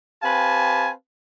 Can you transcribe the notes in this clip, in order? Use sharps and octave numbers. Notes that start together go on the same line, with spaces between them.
C4 G4 B4 F5 G#5 A5